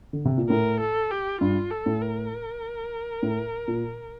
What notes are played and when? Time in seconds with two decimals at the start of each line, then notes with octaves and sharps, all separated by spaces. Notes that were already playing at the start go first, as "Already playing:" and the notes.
0.13 D3
0.25 C3
0.38 A#2
0.49 A2 A#4
0.80 A4
1.11 G4
1.41 G2 F4
1.70 A4
1.86 A2
2.01 A#4
3.23 A2
3.68 A#2